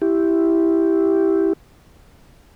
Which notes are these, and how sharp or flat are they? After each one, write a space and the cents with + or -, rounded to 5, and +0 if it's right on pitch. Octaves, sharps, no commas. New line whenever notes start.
E4 +0 G4 +0